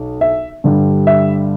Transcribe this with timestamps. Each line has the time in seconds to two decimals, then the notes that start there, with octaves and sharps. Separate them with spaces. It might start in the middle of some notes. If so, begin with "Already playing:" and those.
Already playing: B1
0.21 E5
0.64 G2 D3 G3 D4
1.07 E5